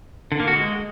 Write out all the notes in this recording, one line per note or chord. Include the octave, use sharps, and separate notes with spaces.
D3
A#3
F#4
G#3